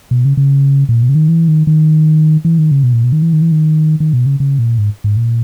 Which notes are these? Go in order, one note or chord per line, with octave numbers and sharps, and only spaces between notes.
B2
C#3
C#3
A#2
B2
C#3
D#3
E3
D#3
D#3
E3
D#3
C#3
B2
A#2
B2
D#3
E3
D#3
E3
D#3
D#3
B2
C#3
C#3
A#2
G#2
G#2
A#2